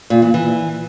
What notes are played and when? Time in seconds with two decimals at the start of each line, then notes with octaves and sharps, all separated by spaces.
0.10 A#2
0.22 E3
0.34 E3